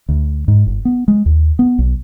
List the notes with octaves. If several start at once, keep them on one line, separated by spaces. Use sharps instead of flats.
D2
G#2
G1
B3
G#3
D#2
B3
B1